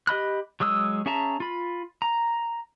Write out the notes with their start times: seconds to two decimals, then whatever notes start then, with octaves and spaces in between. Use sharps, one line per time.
0.07 G4 D#5 B5 F#6
0.60 F#3 G#3 D#6 E6
1.06 C#4 G#4 E5 A5 A#5
1.40 F4 B5
2.02 A#5